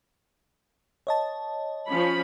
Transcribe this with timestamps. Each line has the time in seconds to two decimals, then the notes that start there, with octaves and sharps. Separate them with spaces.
1.07 C#5 D#5 A5
1.89 F3 C#4 B5